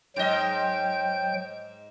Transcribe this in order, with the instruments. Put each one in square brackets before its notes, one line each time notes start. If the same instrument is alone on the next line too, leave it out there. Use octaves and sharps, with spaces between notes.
[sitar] G#2 D#5 [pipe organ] F#3 G5 G6